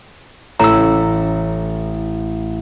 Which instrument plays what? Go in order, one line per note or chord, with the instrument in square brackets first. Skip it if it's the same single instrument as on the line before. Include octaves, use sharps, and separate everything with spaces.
[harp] A1 [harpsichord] A2 [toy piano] A#5 E6